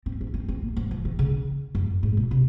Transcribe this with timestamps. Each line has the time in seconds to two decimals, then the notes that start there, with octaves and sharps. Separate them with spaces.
0.06 C4
0.21 C#4
0.34 C4
0.48 C4
0.62 A#3
0.77 F#3
0.91 F3
1.05 D#3
1.19 C#3
1.75 F#2
2.03 G#2
2.17 A#2
2.31 C3